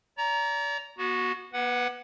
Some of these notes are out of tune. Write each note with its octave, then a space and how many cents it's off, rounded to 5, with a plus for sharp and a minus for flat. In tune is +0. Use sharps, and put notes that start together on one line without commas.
D5 -40 A#5 +0
B3 -35 F#4 +0
A#3 +45 B4 +0 F#5 +0